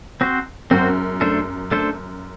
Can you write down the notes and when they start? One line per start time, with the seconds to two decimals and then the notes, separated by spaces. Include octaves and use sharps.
0.21 C4 F#4 C5
0.71 F#2 C4 F#4 C5
1.21 A3 D4 A4 C5
1.71 A3 D4 A4 C5